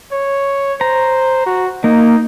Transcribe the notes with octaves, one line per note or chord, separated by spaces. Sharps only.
C#5
C5 A#5
F#4
A#3 D#4